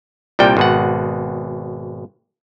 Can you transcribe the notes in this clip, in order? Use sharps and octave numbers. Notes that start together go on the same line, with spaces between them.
C2 A#2 G3 G5
G#1 B2 F#5